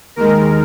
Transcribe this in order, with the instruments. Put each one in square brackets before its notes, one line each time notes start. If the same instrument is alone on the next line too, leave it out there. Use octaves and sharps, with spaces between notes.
[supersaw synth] D#2 D#3 G#3 A#4